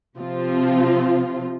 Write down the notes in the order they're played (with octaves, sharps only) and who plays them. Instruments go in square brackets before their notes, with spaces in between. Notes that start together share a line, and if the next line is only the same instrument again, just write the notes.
[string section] C3 F3 C4 F4